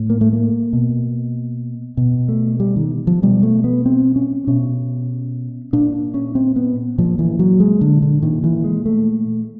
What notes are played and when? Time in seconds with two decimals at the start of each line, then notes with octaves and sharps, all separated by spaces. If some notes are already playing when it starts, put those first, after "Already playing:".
Already playing: A2
0.10 A#3
0.21 A3
0.33 A#3
0.73 B2
1.97 B2
2.28 A3
2.60 G3
2.76 D#3
3.07 F3
3.22 B2 G3
3.43 A3
3.64 B3
3.86 C4
4.16 C#4
4.47 B2 C#4
5.73 A#2 D4
6.14 C#4
6.35 C4
6.56 B3
6.98 A#2 F3
7.19 E3
7.39 F#3
7.60 G#3
7.81 D3
8.02 D3
8.22 A#2 D#3
8.44 E3
8.64 G#3
8.86 A3